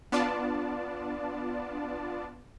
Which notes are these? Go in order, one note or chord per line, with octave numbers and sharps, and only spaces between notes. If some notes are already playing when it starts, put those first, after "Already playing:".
B3 D4 F4 D5 A5